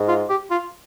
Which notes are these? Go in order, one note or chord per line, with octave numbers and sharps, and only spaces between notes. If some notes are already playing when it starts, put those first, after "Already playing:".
Already playing: G#2
F4
G4
F4